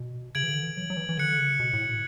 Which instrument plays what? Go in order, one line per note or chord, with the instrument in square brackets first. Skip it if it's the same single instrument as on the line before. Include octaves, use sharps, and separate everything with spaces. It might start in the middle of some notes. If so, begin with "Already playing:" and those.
Already playing: [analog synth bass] B2
[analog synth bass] C#3 [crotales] G#6 D7 F#7
[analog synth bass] E3
D3
E3
F#3
F#3
E3
E3
[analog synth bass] D3 [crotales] F#6 C#7 F#7
[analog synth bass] C#3
B2
A2